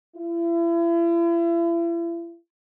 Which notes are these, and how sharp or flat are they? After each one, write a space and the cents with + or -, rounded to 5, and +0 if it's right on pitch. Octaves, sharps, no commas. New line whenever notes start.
E4 +40